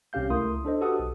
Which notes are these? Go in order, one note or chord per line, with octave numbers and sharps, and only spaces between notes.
C2 C3 C#4 G4 F5 G6
C#2 A3 E4 A#4 C6 D#6
D4 A4 C5 D#5
F#4 G4 A4 B4 F#5 D#6
B1